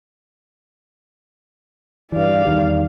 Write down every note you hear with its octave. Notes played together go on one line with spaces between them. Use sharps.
G2 E3 D5 F5
E2 D#3 G3